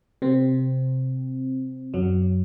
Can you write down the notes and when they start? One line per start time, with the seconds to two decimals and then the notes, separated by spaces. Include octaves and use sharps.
0.22 C3 C4
1.94 F#2 F#3